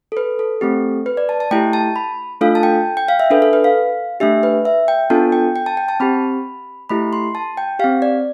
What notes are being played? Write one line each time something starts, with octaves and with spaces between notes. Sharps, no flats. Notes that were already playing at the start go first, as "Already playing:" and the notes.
A4
B4
A4
A3 C4 G4
B4
D5
A5
A5
A3 E4 G4 G5
A5
B5
A3 D4 F4 A4 F5
A5
G5
G5
F5
E5
D4 A4 B4
A4
B4
F5
A3 D4 G4 E5
B4
E5
G5
B3 D4 F4 A4 A5
G5
G5
A5
G5
A5
C4 G4 B5
A3 E4 G4 B5
C6
A5
G5
C4 G4 F5
D5